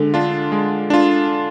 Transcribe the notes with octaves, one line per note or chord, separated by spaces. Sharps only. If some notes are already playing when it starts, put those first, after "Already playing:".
Already playing: D3 G#3
D4 F4
G#3
D4 F4